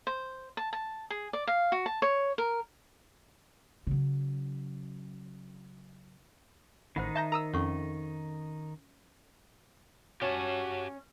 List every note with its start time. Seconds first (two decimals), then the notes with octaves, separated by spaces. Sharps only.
0.07 C5
0.57 A5
0.73 A5
1.10 G#4
1.33 D5
1.47 F5
1.72 F#4
1.86 A5
2.02 C#5
2.38 A#4
3.87 C#3 F#3
6.96 A1 D#3 D#4 C5 F#5 B5
7.15 E5 A5 A#5 G6 A#6
7.32 A#4 A#5 D#6 E6
7.54 F2 C#4 A4 C#6
10.22 C#4 F#4 G4 A5